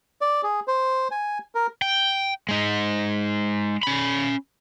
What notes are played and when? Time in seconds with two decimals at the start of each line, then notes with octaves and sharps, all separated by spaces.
0.21 D5
0.43 G#4
0.68 C5
1.11 G#5
1.55 A#4
1.82 G5
2.49 G#3 D#4
3.83 C#4 B5